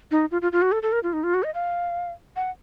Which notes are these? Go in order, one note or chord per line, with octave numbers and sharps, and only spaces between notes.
D#4
F4
F4
F4
F#4
A4
A4
A#4
F4
D#4
F4
F#4
D#5
F5
F#5